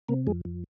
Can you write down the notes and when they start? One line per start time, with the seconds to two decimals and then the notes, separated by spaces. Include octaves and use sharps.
0.09 C3 A#3
0.27 F2 G#3
0.45 F2